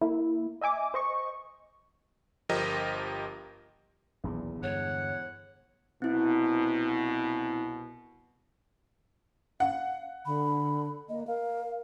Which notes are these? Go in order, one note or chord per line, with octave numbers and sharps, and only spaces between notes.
A#3 E4
D#5 E5 G#5 D6
C5 D#5 C#6
G1 F3 G4 A#4 D#5 A#6
D#1 B1 E2 A#2
G2 D3 G#3 C#5 F#5
C2 B2 C4 E4
F5 F#5
D3 B5
A#3 D#5
A#4 F5